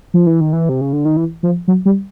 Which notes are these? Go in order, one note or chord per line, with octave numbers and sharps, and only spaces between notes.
F3
E3
D#3
E3
C3
C#3
D3
D#3
E3
F3
F#3
G3